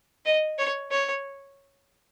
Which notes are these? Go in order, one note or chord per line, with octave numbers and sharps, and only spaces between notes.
D#5
C#5
C#5